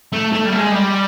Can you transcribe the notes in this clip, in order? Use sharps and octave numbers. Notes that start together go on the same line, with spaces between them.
A3
A3
G3
A3
G#3
G3